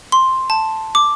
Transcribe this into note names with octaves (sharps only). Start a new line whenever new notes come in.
C6
A5
D6